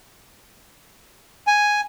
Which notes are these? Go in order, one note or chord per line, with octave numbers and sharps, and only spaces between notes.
G#5